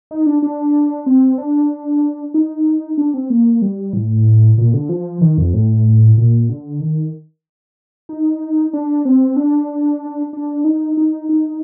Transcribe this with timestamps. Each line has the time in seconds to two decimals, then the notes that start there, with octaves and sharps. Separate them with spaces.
0.11 D#4
0.26 D4
0.42 D4
1.06 C4
1.38 D4
2.34 D#4
2.98 D4
3.14 C4
3.30 A#3
3.62 G3
3.93 A2
4.58 A#2
4.74 D3
4.89 F3
5.21 D#3
5.38 F2
5.54 A2
6.18 A#2
6.49 D3
6.81 D#3
8.09 D#4
8.73 D4
9.05 C4
9.36 D4
10.33 D4
10.64 D#4
10.97 D#4
11.29 D#4